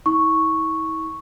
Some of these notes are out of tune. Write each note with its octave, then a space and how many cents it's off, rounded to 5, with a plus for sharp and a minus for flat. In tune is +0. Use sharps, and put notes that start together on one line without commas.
E4 -45 C#6 +0